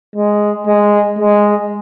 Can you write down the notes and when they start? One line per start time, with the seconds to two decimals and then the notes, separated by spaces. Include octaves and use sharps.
0.16 G#3
0.67 G#3
1.19 G#3